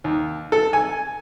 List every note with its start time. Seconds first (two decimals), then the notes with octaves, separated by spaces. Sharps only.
0.04 D#2
0.52 A4
0.73 G#5